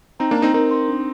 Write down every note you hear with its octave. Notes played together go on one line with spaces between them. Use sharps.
C4 D#4 A#5
A#3 D4
A#5
C4 D#4
C4 D#4 A#4
C6
D4